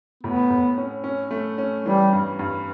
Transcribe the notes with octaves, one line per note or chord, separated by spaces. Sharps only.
A2 B3
A2
C#4
C#4
A3
C#4
E3 G3
G2
G2